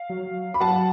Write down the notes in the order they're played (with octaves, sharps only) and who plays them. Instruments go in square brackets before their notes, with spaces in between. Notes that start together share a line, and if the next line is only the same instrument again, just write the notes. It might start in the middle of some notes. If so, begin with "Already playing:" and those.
Already playing: [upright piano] F5
[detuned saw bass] F#3
[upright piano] B5
[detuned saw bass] F#3 [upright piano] F#5 A5